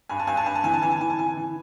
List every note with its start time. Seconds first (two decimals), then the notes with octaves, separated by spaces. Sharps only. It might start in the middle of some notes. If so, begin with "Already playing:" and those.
0.09 G2 G#5
0.19 A5
0.27 G2 G#5
0.37 A5
0.46 G2 G#5
0.55 A5
0.63 E3 G#5
0.74 A5
0.82 E3 G#5
0.92 A5
1.00 E3 G#5
1.10 A5
1.18 E3 G#5
1.37 E3